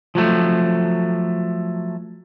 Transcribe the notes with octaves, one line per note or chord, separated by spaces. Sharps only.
F3 F#3 A3